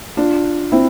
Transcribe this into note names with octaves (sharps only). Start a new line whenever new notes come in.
D4 F4
C4 E4